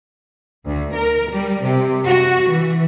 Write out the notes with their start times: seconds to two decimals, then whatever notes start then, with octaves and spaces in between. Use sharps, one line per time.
0.66 D2
0.96 A#4
1.30 G3
1.64 C3
2.06 F#4
2.49 E3